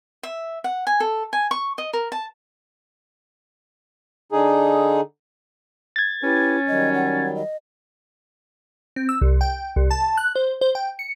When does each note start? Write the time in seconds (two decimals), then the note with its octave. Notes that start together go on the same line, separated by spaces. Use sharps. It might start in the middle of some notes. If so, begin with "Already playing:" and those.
0.23 E5
0.64 F#5
0.87 G#5
1.00 A4
1.33 G#5
1.51 C#6
1.78 D#5
1.93 A#4
2.12 A5
4.32 D3 D#4 G#4
5.96 G#6 A6
6.23 C#4 E4 G4 B4
6.68 D#3 F#3 G3 D#5
6.94 F#5
7.35 D#5
8.96 C4
9.09 E6
9.22 C2
9.41 G5
9.76 C2
9.91 A5
10.17 F#6
10.35 C5
10.61 C5
10.75 G5
10.99 C#7